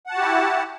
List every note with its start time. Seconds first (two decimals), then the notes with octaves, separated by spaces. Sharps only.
0.07 F#5
0.10 A5
0.14 F#4
0.18 G4
0.21 E4